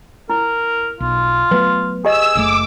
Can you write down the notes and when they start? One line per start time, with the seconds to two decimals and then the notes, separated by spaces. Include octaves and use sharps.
0.30 E4 A#4
1.00 B1 F4
1.51 F#3 A3 B3 B4
2.05 G4 G#4 D#5 E6
2.35 F#1 A#2 A3 D6